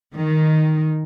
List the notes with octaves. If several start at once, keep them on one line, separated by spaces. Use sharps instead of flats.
D#3